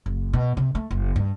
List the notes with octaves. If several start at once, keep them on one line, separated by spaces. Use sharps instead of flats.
F#1
B2
C3
A3
F#1
G2